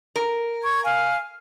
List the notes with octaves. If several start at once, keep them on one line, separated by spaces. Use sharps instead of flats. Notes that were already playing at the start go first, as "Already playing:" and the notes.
A#4
C#6 G#6
F5 G#5 F6